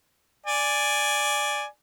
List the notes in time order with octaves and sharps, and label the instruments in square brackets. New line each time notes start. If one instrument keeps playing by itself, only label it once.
[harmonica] D5 G#5